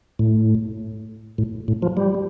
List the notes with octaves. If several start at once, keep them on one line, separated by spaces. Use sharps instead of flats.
A2
A2
A2
F3
G3